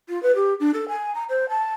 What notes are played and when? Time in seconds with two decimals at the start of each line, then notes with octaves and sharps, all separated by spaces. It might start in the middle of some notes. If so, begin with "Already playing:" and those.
0.09 F4
0.23 B4
0.35 G4
0.60 D4
0.74 A4
0.89 G#5
1.15 A#5
1.29 C5
1.49 A5